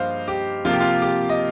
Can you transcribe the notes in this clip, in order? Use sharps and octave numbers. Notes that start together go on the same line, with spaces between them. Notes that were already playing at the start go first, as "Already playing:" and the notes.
Already playing: G2 F3 A#3 C5 D#5 F5
G4
C3 F3 A#3 F4
G4
F4
G4
D#5